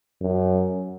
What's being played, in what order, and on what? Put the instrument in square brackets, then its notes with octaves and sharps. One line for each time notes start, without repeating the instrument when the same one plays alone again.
[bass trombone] F#2